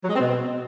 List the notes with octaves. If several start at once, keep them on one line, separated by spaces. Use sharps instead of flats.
F#3
G#3
C4
B2